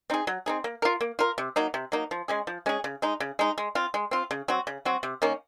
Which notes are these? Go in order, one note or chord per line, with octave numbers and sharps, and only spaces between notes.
C4 D#4 G#4
F#3
C4 D#4 G#4
A#3
F4 A#4
A#3
F4 A#4
C3
F#3 A#3 D#4
C3
F#3 A#3 D#4
F3
G#3 C#4 G#4
F3
G#3 C#4 G#4
C#3
G#3 D#4
C#3
G#3 D#4
G#3
C4 F4
G#3
C4 F4
C#3
F#3 C4 F#4
C#3
F#3 C4 F#4
C3
D#3 A#3 C#4